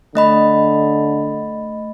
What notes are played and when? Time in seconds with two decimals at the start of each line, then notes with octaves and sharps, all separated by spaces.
0.15 D3 A3 D#5 B5